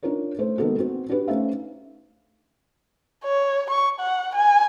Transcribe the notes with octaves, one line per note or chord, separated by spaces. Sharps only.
D4 D#4 F4 A#4 C#5
A3 C5
D#3 G#3 A#3 B3 F#4 A4
B3 C4 F#4
D4 F#4 G4 B4
A3 C#4 D#4 C5 E5 F5
C#5
C#6
F#5
G#5